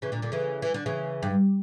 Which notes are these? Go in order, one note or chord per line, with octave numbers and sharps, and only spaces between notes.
C#3 E3
A#2 D3
A#2 D3
C#3 E3
E3
D3
C#3 E3
G2